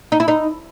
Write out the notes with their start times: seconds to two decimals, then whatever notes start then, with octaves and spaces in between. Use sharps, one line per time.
0.12 D#4
0.20 E4
0.28 D#4